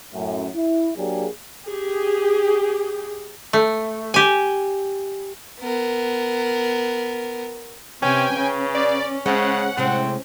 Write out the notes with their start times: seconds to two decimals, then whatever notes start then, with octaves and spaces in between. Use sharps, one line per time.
0.13 F#2 A2
0.55 E4
0.96 F#3 A#3 D4 G4 G#4
1.66 G4 G#4
3.53 A3
4.14 G4 G#5
5.61 B3 A#4
8.02 C3 C#4 B4 G5 G#5
8.36 C#3 C#4
8.75 D5
9.26 C#3 G#3 C4 F#5
9.77 A2 C3 G#3 C4